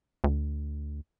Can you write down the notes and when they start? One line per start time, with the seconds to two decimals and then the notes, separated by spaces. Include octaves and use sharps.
0.24 D2